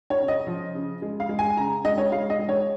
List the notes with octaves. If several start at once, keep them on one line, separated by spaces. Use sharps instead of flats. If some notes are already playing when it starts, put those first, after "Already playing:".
C#5
C#3
D#5
F3
C#3
G#3
F5
G#3
G#5
C#3 A#5
G#3 D#5
C#5
G#3 F5
D#5
G#3
C#5